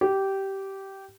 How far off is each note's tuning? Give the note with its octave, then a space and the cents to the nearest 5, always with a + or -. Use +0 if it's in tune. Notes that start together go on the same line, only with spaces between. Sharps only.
G4 -15